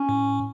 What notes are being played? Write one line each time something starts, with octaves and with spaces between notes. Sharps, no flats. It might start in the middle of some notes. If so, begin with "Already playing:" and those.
Already playing: C#4
A2